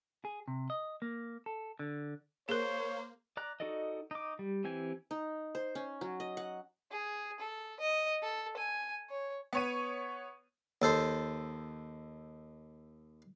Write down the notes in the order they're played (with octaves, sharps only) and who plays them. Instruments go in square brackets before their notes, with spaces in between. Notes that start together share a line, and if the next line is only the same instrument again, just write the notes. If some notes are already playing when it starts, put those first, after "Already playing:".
[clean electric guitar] G#4
C3
D#5
A#3
A4
D3
[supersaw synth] A#3 [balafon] G#4 A#4 [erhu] C5 [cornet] C#5
[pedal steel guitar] D5 A#5 F#6
D#4 F#4 A4 D5 D#5
D#4 D6
G3
E3 C4 G4 G#5
[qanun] D#4
C5
C#4
F#3
D#5
F#5
[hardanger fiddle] G#4
A4
D#5
A4
G#5
C#5
[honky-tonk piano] B3 C#5 D#7
[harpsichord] D#2 A4 C5